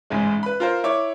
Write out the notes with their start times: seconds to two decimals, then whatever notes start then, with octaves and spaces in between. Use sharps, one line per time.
0.10 A1 G#2 G#3
0.43 B4 B5
0.60 F4 A#4 C5
0.84 E4 C#5 D6